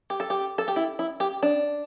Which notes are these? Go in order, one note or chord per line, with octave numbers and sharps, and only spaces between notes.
G4
A4
G4
A4
G4
E4
E4
G4
D4